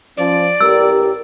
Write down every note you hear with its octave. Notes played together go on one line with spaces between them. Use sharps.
F3 C#4 D5
A1 G4 A#4 E6